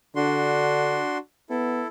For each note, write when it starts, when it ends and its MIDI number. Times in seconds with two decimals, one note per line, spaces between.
0.16 1.01 50
0.16 1.18 62
0.16 1.18 66
0.16 1.18 84
1.50 1.84 59
1.50 1.87 64
1.50 1.87 69